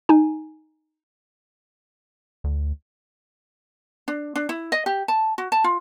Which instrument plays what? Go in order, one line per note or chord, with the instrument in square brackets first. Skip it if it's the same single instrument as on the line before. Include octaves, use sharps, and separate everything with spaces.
[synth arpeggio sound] D#4 G#5
[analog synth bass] D2
[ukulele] D4
D4
E4
D#5
G4
A5
F#4
A5
F4